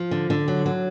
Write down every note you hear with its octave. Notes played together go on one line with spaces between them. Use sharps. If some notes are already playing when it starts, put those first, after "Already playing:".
Already playing: F3
D3
D3
F#3
F#3